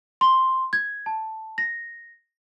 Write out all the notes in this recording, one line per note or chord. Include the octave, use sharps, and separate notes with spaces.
C6
G#6
A5
A#6